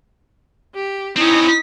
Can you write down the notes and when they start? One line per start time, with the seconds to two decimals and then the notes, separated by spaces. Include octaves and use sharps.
0.75 G4
1.16 C4 C#4 D#4 E4